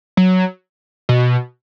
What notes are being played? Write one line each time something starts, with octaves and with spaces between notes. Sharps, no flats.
F#3
B2